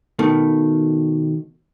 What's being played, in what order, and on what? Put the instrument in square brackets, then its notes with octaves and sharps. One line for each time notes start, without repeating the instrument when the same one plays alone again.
[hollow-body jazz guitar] B2 D#3 A3